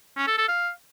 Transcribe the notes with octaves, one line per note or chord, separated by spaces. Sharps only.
C#4
A4
A4
F5